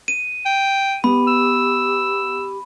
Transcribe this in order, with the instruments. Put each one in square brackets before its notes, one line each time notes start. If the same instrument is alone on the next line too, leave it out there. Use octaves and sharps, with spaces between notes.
[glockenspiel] D#7
[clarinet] G5
[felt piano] B3 [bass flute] G4 [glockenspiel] B5
[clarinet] E6